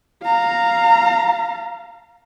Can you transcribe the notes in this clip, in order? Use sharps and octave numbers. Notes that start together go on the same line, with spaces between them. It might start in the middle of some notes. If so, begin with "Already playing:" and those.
F5 A#5